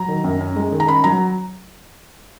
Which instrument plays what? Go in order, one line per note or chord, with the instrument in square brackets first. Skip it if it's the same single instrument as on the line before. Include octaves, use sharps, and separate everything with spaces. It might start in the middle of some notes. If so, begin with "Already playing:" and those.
Already playing: [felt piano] F#3 A#5
D#3
F#2
C#4
G#3
D#3
A#5
C#4 B5
F#3 A#5